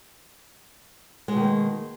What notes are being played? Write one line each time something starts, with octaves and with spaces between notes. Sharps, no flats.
B2 D#3 G#3 A#3